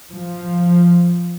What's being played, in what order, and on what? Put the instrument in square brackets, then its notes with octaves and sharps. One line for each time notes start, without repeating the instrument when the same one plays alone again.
[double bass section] F3